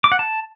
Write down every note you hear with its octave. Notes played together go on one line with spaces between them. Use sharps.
D6
F#5
A5